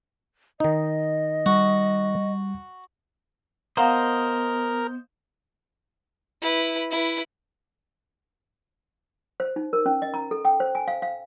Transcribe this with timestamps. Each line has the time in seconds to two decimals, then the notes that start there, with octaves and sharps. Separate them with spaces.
0.60 D#3 D#4 D#5
1.46 G3 F#4
3.77 B3 A#4 C5 D#5 F5 F#5 A#5
6.42 E4 B4
6.91 E4 B4
9.40 C5
9.56 D#4
9.73 A#4
9.86 C#4
10.02 D#5
10.14 A#5
10.31 A4
10.45 G5
10.60 C5
10.75 G#5
10.88 F5
11.02 F5